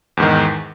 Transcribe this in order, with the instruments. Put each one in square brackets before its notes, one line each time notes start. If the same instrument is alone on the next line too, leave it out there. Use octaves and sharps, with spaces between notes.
[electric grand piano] E2
G#2
D#3